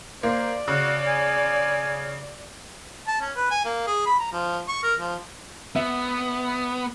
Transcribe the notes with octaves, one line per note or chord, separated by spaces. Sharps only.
A#3 C5 D5
C#3 F#4
G#5
A5
C#4
B4
G#5
A#3
G#4
B5
A#5
F3
C#6
A#4
F3
B3 E5